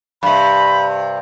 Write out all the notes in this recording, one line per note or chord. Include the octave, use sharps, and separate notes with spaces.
G2 C3 B5